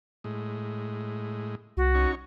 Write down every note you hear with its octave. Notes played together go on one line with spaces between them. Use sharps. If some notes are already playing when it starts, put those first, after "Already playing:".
A2 G#3
C2 F#4
C#4 D#4 C#6